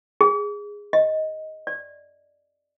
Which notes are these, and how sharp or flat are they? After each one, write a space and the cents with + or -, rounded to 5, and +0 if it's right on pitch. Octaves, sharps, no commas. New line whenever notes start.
G#4 -15
D#5 +10
D5 +0